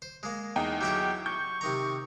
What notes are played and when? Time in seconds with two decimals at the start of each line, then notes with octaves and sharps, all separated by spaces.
0.02 C5
0.23 G#3 A#3
0.56 E2 D#4 G5
0.81 F#3 E4 G4 E5
1.26 C#6 G6
1.61 C3 D#3 A#5